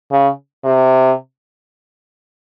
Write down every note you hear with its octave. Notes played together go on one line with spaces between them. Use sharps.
C#3
C3